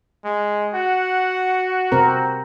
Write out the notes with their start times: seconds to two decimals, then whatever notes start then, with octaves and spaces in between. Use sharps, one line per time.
0.25 G#3
0.74 F#4 F#5
1.92 C3 C4 A#4